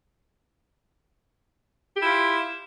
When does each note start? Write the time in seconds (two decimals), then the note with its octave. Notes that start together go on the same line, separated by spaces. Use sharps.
1.96 G4
2.00 E4
2.05 F4